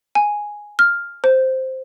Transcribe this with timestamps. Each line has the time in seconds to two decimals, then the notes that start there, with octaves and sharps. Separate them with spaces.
0.15 G#5
0.79 F6
1.24 C5